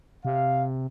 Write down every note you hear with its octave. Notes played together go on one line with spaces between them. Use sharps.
C3 F5